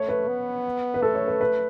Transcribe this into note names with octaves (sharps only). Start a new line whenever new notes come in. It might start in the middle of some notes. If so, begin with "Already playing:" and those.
Already playing: A3 C#5
B4
B3
B4
A3 A4
C#5
B4
B4